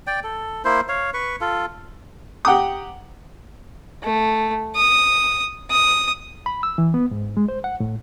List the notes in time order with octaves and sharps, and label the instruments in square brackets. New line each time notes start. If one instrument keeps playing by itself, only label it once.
[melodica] D5 G5
A4
A#3 E4 C5
C#5 F5
B4 C#6
F4 A4
[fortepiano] G4 F#5 G5 A#5 D6 D#6
[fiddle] A3
D#6
D#6
[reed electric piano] B5
E6
E3
B3
G#2
G#3
C5
F#5
A2